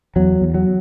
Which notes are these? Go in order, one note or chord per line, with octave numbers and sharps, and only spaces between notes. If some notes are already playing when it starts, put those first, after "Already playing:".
E2 F#3
E2
F#3